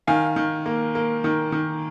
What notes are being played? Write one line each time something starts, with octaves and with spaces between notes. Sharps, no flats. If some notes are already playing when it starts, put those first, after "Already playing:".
D#3 F5 G#5
D#3
A#3
A#3
D#3
D#3